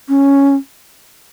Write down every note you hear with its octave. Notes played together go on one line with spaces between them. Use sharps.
C#4